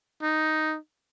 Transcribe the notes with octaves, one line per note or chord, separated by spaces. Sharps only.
D#4